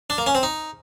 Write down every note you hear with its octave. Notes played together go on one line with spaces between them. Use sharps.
D4
A#3
C#4
C4
D#4